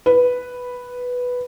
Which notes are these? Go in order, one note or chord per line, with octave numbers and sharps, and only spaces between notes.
B4